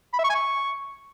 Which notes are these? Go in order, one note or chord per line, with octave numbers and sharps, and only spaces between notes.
B5
E5
C#6
G#5
C#6